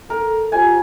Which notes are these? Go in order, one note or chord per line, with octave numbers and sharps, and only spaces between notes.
A4 A#4
F4 G4 C5 G#5